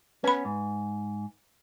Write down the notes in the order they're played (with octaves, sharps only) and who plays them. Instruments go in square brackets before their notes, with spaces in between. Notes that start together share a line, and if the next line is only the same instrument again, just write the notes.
[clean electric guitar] B3 C#4 [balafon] B4 B5
[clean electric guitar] G#2